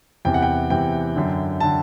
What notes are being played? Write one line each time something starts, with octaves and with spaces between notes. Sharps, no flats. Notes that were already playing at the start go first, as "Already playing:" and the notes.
E2 C3 E3 G5
F#5
G5
E2 C3 E3 G5
F#2 D3
D3 A5